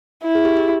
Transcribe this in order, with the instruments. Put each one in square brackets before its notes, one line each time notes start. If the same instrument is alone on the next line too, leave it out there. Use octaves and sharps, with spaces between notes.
[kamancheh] E4
[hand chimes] G#4
G4
G4